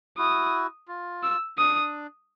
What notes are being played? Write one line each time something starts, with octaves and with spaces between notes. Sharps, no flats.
E4 F#4 D#6
F4
E6
D4 D#6